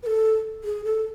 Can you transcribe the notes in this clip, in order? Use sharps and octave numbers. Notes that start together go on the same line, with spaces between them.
B4
A4
G#4
A4